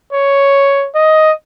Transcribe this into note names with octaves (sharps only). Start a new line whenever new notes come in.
C#5
D#5